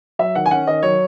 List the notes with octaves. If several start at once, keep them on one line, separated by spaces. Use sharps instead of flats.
F#3 E5
D#3 F#5
G#5
C#4 F#5
D#3 D#5
F#3 C#5